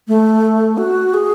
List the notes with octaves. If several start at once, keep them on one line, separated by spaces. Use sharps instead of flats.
A3
F#4
G#4